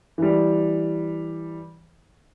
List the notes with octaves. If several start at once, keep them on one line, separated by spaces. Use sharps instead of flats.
E3 G3